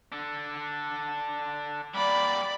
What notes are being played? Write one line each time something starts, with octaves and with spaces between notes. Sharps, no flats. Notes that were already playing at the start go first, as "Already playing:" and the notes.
D4 A4
G3 A#3 D5 B5